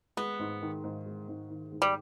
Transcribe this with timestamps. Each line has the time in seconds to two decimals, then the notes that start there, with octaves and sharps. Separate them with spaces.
0.17 G#3 B3
0.39 G#2
0.62 D#3
0.84 G#2
1.06 G#3
1.28 G#2
1.50 D#3
1.72 G#2
1.82 G3